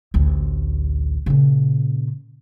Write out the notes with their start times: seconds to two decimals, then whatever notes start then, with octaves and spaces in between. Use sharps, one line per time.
0.14 A1 D2
1.26 A#2 C#3